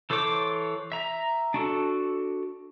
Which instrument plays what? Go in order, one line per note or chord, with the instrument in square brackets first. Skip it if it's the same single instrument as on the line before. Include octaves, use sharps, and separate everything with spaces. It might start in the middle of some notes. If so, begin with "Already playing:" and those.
[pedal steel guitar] E3 A4 C5 C#5 D6
E5 A#5
D4 F#4 A4